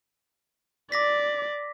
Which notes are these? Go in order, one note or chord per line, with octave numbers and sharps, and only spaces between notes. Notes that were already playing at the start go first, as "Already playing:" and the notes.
D5 D6 A#6 B6